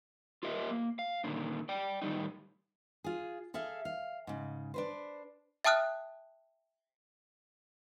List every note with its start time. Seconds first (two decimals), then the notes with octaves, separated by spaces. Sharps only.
0.43 F4 G4 A#4 D#5 E5
0.71 A#3
0.99 F5
1.24 A#2 D3 D#3
1.69 D5 G5
2.02 A2 D#3 G3 D#4
3.04 F4 G#4
3.54 G#4 A4 E5 F5
3.85 F5
4.27 G#2 C#3
4.74 D4 B4 C5
5.64 E5 G5 A5 D#6 F6 F#6